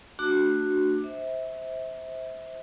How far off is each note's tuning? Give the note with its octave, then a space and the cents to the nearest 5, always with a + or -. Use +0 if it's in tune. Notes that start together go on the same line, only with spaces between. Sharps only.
A3 +25 D4 +15 F#4 +0
C5 +0 E5 -25